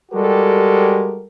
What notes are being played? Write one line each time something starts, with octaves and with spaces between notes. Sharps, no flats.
G3 G#3 F#4 G4 A4 A#4